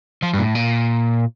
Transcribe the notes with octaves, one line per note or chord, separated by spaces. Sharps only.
F3
G2
A#2
A2
A#2